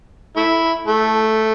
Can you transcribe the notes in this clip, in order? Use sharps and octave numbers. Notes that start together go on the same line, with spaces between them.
A3 E4
A3